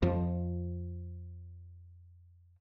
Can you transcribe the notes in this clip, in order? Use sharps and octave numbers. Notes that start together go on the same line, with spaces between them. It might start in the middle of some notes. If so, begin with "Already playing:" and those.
F2 F3